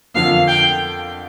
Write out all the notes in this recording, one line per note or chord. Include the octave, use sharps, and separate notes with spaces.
F2 D3 F3 A#3 F5
G5